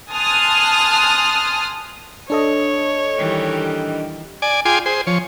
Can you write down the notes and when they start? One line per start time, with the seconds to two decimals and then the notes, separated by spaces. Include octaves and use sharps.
0.12 G#5 A5 C6 D#6 F6 F#6
2.30 D4 A4 C#5 D#5
3.17 D#3 E3 G3
4.42 D5 G#5
4.65 F4 G#4 G5 G#5 C6 D6
4.86 G#4 C5
5.07 F3 C#5